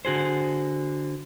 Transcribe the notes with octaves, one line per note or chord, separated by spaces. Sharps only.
D3 F#4 G#4 C5